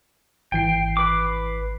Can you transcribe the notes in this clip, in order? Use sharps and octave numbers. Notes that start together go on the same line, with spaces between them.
G#1 E3 G5 C7
B4 D6